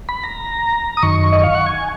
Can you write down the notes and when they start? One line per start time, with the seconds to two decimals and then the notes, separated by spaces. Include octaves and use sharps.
0.09 B5
0.24 A#5
0.97 D#6
1.03 F#2 D#3 C#6
1.32 D#5
1.43 F5
1.55 F#5
1.66 G#5